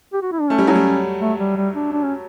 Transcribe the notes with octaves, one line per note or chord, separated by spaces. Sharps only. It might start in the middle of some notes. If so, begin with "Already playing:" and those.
G4
F#4
E4
D4
A3 C#4
G3
F#3
G3
A3
G3
G3
D4
D4
C#4